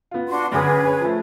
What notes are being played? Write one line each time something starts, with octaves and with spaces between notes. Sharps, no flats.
B3 F4
D4 F#4 C6
F#2 D3 G#4 B4 G#5 D6
C#4
C#5
F3 A3